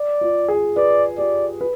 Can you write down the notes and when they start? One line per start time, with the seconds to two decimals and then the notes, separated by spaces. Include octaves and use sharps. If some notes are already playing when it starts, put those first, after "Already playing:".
Already playing: D5
0.21 F4
0.48 G#4
0.77 B4 D5
1.18 G4 D5
1.61 B4